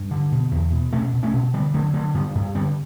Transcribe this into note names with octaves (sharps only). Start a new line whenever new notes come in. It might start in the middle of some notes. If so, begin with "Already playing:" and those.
Already playing: G2
D3
B2
E2
B2
B2 A3 C#4
B2
A3 C#4
B2
D3 G3 B3
D3 F#3 A3
D3 F#3 A3
G2 G3 B3
G2
D3 G3 B3